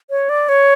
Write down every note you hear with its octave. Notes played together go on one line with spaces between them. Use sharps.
C#5
D5
C#5